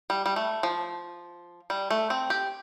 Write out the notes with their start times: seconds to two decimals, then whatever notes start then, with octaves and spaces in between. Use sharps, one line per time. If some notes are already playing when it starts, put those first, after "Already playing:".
0.10 G3
0.26 G3
0.36 A3
0.63 F3
1.70 G3
1.90 A3
2.10 C4
2.30 G4